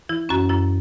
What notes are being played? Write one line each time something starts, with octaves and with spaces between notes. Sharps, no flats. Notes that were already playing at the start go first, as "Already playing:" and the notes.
E3 E4
F#2 C#4 F#4
F#2 E4